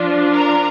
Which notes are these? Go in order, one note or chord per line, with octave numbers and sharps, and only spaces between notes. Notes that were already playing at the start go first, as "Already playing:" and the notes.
Already playing: F3 D4 F4
A#4 A#5